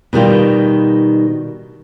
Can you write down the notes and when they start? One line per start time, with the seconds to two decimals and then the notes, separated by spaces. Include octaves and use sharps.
0.13 B2 D#3 G3 F4